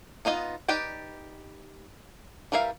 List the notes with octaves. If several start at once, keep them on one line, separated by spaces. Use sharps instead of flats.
B3 D#4 F4 D#5
D#4 G4 B4 D5 G5
E3 G3 A#4 E5 F5